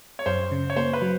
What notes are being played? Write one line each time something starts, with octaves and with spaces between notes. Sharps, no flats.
C#5
F#2 C5
C#3
C#5
A#3 C5
B4
F#3